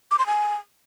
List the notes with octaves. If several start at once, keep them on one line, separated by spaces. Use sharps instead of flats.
D6
C6
G#5